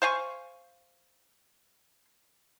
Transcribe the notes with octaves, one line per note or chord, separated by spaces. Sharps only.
C5 F5 G#5 C#6